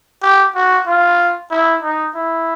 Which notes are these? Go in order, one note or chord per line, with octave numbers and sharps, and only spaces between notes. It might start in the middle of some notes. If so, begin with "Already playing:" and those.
G4
F#4
F4
E4
D#4
E4